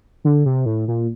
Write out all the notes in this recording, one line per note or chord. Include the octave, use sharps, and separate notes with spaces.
D3
C3
A2
A#2